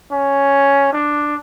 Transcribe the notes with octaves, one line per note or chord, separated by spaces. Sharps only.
C#4
D4